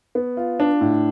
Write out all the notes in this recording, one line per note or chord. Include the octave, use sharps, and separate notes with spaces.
B3
F4
D4
A2